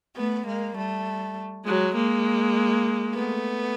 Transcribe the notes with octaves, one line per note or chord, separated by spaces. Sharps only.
A3 B3
G#3 A#3
G3 A3
F#3 G#3
G#3 A#3
A3 B3